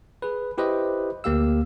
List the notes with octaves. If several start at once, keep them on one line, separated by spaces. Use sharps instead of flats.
G#4 B4
E4 G4 B4 C5 D#5
D2 A#3 G4 F5 E6